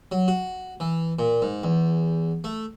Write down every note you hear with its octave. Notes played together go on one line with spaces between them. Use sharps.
F#3
F#4
E3
A#2
G#2
E2
A3